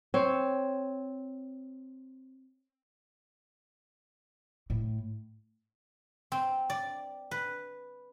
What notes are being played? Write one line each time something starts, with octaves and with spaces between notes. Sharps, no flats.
C4 C#5
A2
C4
D5
B4